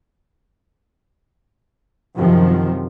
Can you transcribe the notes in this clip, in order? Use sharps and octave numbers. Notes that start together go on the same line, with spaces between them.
F#2 C3 D#3 F3